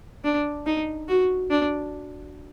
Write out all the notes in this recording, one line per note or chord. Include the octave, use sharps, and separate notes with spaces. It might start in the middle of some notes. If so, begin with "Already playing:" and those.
D4
D#4
F#4
D4